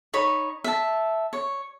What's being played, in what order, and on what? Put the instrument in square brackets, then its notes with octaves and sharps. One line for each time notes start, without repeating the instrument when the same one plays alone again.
[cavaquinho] D#4 C#5 B5
E5 A5
C#5